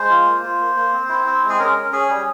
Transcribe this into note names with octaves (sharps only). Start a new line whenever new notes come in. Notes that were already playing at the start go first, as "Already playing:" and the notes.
Already playing: G#3 C5
F4
A#3
F4
A#3
A#3
C4
E4
C4
G#3
G#4
C#4 A#4
C#4
C#4 G#4
G3